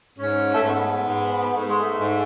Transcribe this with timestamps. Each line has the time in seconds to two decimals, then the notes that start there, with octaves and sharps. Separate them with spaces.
0.19 G#2 C#4
0.55 A3
0.63 G#2 B3
1.08 G#2
1.54 G#2 A3
1.67 G#3
1.80 A3
1.98 G#2